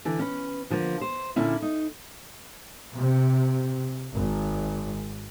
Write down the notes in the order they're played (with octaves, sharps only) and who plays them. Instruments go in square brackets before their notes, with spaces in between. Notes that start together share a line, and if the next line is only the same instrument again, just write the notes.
[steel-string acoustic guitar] D3 E3
C#4 B4
D3 F3 A#3
C5
A#2 D3 C#4 E4
D#4
[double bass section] C3
G#1